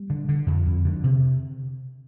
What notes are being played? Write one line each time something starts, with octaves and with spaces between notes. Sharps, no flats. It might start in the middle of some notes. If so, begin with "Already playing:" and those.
Already playing: G3
D3
D3
F2
F2
D3
C3